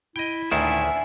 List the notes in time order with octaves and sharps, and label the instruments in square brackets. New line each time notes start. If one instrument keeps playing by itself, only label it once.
[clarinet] E4 [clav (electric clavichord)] D#5 G5
[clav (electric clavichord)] D2 D#3 [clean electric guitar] A2 E4 F4 [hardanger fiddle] D4 G#5 [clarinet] E5